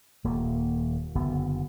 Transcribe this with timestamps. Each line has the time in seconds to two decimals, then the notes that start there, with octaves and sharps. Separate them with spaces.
0.24 D#1 A#3
1.15 F#1 D3 B3